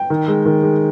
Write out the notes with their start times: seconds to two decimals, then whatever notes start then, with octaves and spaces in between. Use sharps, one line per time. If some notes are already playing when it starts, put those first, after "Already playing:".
Already playing: G5
0.10 D#3
0.28 G#3
0.46 D#3
0.63 G#3